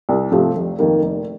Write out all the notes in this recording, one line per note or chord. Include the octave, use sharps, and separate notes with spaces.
C2
C3 F3 A3
F1
F2 D#3 A#3
F1